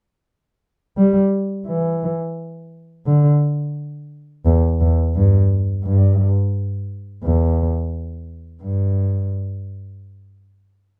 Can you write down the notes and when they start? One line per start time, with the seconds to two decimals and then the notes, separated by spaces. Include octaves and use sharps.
0.97 G3
1.67 E3
3.06 D3
4.46 E2
4.80 E2
5.15 G2
5.84 G2
7.23 E2
8.63 G2